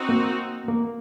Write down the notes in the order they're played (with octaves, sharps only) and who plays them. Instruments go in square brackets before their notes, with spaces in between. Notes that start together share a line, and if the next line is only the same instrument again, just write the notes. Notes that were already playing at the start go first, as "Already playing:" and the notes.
Already playing: [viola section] C4 D#4 F#4
[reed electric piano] A#3
A#3